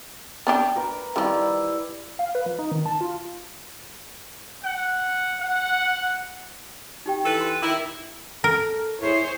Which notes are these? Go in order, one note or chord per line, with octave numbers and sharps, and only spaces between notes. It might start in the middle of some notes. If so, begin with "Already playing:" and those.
B3 D4 G4
A#4 B4 D6
D#3 F3 G3 E4
F5
B4
F3
D#4
D#3
A5
F4
F#5
F#5
D#4 G4 G5
E3 A4 B4
C6
D#3 E4 A#4 B5 D6
A4 A#4
E4 G#4 C5 C#5